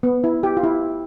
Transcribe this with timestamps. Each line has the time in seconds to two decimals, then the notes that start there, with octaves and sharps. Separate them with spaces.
0.03 B3
0.24 E4
0.43 G4
0.57 F4
0.64 E4